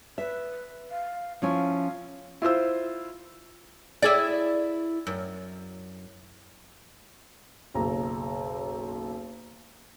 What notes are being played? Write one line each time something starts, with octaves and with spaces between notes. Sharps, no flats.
B4 E5
F5
F3 C#4 E4 F5
E4 F4 C5 E6
E4 G#4 D5
F#2
F#1 B1 A#5